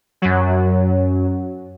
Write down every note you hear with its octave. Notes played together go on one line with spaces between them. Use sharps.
F#2 F#3